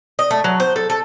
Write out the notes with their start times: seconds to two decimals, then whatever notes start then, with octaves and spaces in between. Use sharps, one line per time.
0.19 D#5
0.31 A3
0.44 F#3
0.60 C5
0.76 A4
0.90 A4